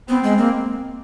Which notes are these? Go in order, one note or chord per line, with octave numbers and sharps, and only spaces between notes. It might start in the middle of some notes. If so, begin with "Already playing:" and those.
B3 C4
G#3
A#3